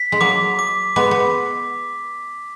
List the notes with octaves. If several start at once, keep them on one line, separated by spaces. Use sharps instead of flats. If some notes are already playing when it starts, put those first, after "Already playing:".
Already playing: B6
G#3
F#3 A#3 D6
D6
G#3 B3 D6
B3